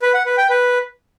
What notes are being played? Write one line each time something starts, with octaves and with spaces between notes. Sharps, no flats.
B4
F#5
B4
G5
B4